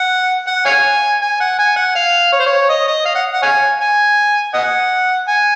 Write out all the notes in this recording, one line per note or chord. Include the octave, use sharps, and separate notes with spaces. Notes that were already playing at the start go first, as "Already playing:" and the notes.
Already playing: F#5
F#5
C#5 F5 G#5
G#5
F#5
G#5
F#5
F5
C#5
C5
C#5
D#5
D#5
F5
F#5
F#5
C#5 F5 G#5
G#5
D#5 F#5
G#5